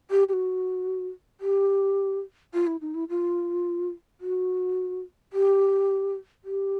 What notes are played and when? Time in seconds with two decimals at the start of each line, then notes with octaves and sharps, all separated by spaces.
0.11 G4
0.29 G4
0.33 F#4
1.40 G4
2.53 F4
2.67 E4
2.81 D#4
2.94 E4
3.09 F4
4.21 F#4
5.33 G4
6.44 G4